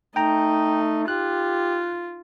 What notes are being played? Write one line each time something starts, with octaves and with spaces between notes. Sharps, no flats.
A3 D#4 G5 A#5
F4 G4 F#6